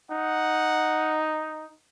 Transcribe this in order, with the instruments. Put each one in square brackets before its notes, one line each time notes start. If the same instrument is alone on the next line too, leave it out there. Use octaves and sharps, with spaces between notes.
[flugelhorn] D#4 [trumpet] F#5